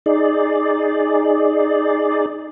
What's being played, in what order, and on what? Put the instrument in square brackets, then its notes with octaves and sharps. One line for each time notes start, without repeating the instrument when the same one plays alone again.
[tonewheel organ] D#4 G#4 D5